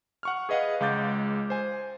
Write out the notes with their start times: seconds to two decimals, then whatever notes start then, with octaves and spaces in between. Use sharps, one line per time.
0.23 F#5 C#6 F6
0.49 G#4 B4 D#5 F5 F#5
0.80 C#2 G#3 F5 D6 G6 A6
1.50 C5 G#5